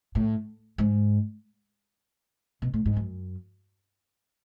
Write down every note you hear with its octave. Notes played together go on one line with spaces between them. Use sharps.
A2
G#2
B2
A2
G#2
F#2